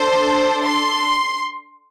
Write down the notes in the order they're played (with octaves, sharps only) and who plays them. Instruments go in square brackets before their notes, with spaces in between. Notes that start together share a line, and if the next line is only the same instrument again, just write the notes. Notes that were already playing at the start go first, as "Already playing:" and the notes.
Already playing: [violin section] D4 A4 C5
C6